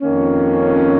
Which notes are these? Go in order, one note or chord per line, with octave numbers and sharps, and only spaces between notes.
F2 D#3 A#3 C#4